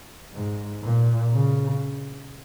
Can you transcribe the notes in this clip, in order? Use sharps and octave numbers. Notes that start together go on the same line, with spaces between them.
G#2
A#2
C#3